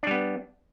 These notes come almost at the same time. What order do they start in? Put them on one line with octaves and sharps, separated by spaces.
D4 G3 B3